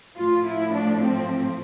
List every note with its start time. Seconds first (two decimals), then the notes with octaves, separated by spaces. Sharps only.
0.17 A2 F3 A3 F4
0.46 E4
0.74 D4
1.03 C4